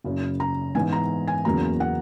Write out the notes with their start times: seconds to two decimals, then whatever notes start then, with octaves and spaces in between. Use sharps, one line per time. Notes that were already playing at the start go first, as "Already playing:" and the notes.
0.04 F#1 F#2 C#3
0.40 A#5
0.75 G#2 E3 B3 G#5
0.92 A#5
1.28 G#5
1.45 F#1 E2 C#3 F#3 A#3 A#5
1.80 F#5